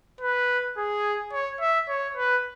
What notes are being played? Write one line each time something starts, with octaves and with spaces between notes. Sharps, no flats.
B4
G#4
C#5
E5
C#5
B4